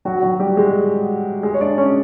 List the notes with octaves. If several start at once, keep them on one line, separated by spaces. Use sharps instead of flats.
F#3 F#4
F#3 F#4
G3 G4
G#3 G#4
G#3 G#4
C#5
D4 D5
C#4 C#5